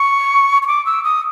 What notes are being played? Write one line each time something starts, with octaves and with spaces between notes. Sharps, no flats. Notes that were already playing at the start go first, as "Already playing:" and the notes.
Already playing: C#6
C#6
D6
E6
D#6